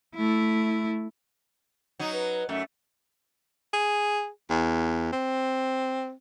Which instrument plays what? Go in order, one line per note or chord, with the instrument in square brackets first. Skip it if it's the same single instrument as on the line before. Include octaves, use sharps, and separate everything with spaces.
[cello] A3 E4
[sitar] F#3 D#4
[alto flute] B4
[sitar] F#2 A3 [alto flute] E5
[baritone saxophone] G#4
E2
C4